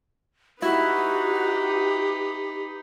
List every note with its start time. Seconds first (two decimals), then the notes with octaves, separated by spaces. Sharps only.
0.62 D#4 E4 F#4 G4 B4